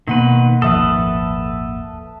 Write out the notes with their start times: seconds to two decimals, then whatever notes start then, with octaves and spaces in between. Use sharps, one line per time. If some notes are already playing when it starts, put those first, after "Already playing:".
0.08 B2 D#3 A#3 B4 F#5
0.62 D#1 G#1 F3 A4 B4 E5 D#6